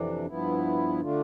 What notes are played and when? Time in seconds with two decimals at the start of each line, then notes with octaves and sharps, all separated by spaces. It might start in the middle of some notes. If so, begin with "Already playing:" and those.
Already playing: F2 C3 E3 D4
0.26 G2 F3 B3 E4
1.01 D3 A3 D4 F4